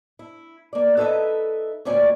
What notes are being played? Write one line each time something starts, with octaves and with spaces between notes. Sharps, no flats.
E4
A#3 D5
D#4 A4 B4 C5 D#5 E5
D2 A#2 G3 C#4 C#5 D5